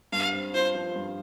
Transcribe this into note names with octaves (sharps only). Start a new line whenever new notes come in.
G2 F5
C4
F4 C5
F3
G2